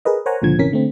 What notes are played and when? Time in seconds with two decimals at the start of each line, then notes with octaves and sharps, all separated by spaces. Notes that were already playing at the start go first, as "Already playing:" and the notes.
0.05 G#4 A#4 B4 D#5
0.26 A#4 C5 C#5 F#5 G#5 A#5
0.42 C#2 A#2 D3 F3 G#6
0.58 G#1 C3 E3 C#4 A#4 B6
0.71 D3 A3 C4